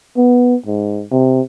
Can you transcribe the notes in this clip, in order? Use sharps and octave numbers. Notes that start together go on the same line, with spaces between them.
B3
G#2
C3